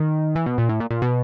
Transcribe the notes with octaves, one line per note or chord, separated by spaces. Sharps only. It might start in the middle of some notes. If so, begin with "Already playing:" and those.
Already playing: D#3
E3
B2
A#2
A2
A#2
A#2
B2